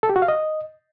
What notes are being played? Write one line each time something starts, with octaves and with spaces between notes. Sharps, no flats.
A4
G4
F#4
F5
D#5